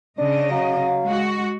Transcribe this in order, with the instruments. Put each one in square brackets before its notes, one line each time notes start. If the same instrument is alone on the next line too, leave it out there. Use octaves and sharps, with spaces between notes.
[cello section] C#3 D#5 [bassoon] D4
[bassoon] F#3 [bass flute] F5
[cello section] G#3 F#4